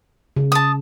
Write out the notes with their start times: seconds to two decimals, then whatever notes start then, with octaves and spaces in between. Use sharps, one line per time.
0.36 C#3
0.52 A5 D#6